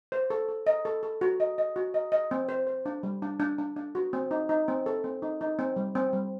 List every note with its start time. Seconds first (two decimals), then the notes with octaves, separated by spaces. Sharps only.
0.12 C5
0.30 A4
0.49 A4
0.67 D#5
0.85 A4
1.03 A4
1.21 F#4
1.40 D#5
1.58 D#5
1.76 F#4
1.94 D#5
2.12 D#5
2.31 C4
2.49 C5
2.67 C5
2.86 D4
3.03 G3
3.22 D4
3.40 D4
3.58 D4
3.76 D4
3.95 F#4
4.13 C4
4.31 D#4
4.49 D#4
4.68 C4
4.86 A4
5.04 C4
5.22 D#4
5.41 D#4
5.59 C4
5.76 G3
5.95 C4
6.13 G3